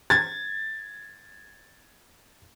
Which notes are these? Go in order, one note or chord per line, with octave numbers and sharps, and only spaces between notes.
G#6 A6